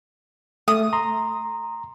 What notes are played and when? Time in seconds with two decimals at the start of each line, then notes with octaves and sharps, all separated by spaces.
0.68 A3 D#6
0.93 A#5 C6